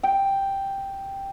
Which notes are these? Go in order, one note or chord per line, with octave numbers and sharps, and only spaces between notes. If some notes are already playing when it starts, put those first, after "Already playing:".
G5